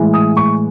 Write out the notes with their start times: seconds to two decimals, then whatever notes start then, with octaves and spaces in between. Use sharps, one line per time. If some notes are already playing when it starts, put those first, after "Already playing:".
Already playing: A2 E3 G#3
0.14 D#6
0.37 C#6